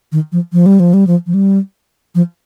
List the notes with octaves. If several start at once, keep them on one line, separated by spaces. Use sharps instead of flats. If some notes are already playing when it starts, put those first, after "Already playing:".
D#3
F3
F3
G3
F3
G3
F3
F3
G3
F3